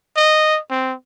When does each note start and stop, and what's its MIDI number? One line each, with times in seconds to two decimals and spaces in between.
0.16 0.59 75
0.71 0.93 60